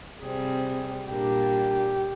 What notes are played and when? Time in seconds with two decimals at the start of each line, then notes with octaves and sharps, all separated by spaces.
0.21 C3 G3 C4 G#4
1.09 A#2 G3 A#3 D4 G4